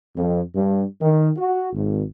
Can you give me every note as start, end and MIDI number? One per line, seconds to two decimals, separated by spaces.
0.16 0.41 41
0.55 0.85 43
1.01 1.29 51
1.37 1.68 66
1.73 2.03 32